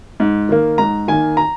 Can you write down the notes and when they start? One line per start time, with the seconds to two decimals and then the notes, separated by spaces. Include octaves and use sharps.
0.20 G#2
0.49 D#3 A#3
0.78 G#2 A#5
1.08 D#3 A#3 G#5
1.37 A#5